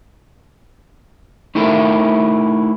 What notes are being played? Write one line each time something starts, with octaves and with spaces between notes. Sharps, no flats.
A3 D#4 E4 G4 A4 A#4